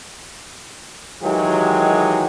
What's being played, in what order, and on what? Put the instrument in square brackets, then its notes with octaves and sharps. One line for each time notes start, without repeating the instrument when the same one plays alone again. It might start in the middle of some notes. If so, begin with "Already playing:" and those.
[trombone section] D#3 E3 F#3 G#3 G4